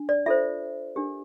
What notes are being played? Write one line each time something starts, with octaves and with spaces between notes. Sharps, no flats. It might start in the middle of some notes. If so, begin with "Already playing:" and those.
Already playing: D4
D5
F4 A4 C5 E5
D4 G4 A#4